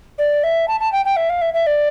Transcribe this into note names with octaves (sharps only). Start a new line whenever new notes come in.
D5
E5
A5
A5
G5
G5
E5
F5
E5
E5
D5